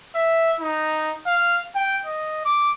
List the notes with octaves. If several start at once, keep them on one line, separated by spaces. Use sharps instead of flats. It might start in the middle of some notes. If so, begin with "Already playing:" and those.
E5
D#4
F5
G5
D#5
D6